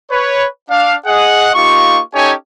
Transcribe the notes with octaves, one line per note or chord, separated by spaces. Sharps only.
B4 C#5
D4 F5
G#4 D#5 F#5
A#3 D#4 F4 G4 C#6
C#4 D#4 G4 A4 C#5 G#5